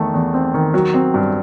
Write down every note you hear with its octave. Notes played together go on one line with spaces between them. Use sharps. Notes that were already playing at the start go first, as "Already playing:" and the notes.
Already playing: E2 D#3 A3
E2
C4
D#3
F#3
C4
G2